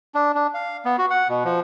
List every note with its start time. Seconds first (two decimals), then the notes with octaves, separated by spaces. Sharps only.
0.15 D4
0.35 D4
0.54 F5
0.85 B3
0.98 F#4
1.10 F#5
1.28 B2
1.45 F3